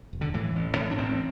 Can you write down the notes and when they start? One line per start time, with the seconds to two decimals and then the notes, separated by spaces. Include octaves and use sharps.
0.13 E1
0.21 D3
0.34 A2 E3
0.56 A1
0.77 A2 A3
0.91 D4
0.98 A1 C4